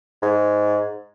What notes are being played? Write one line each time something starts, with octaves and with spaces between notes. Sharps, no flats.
G#2